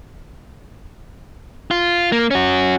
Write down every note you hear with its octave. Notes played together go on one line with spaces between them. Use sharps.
F4
A#3
C#4 F#4